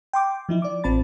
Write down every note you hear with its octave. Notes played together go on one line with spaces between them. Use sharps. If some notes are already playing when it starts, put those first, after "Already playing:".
G5 C6 D6
F3 D#4 E4
D5 D6
A1 C4 F4 A5 B5 A6